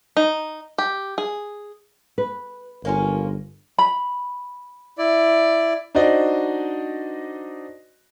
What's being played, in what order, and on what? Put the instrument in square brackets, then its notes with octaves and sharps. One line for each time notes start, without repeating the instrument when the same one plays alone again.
[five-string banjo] D#4
G4
G#4
[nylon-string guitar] B4
[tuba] G1 [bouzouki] A#3 C#4 F4
[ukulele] B5
[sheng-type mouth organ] E4 D5
[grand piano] D4 D#4 F#4 C5 D5 D#5